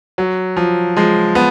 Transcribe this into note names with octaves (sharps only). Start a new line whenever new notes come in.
F#3
F3
F3 G#3
B3